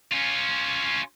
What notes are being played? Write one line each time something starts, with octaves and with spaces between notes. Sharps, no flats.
C#4 F4